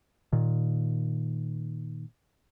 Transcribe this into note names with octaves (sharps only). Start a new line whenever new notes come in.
A#2 D#3